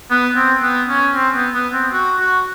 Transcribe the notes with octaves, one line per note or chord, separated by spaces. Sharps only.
B3
C4
B3
C#4
C4
B3
B3
C4
F#4
F#4